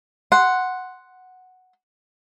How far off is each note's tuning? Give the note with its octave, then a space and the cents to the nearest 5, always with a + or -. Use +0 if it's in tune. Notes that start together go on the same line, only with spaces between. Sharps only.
F#5 +0 C6 +0